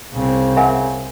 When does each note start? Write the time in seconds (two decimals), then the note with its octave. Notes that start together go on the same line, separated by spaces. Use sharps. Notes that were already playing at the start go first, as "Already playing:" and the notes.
0.13 C2 C#3 C4
0.57 A#4 E5 F#5 G#5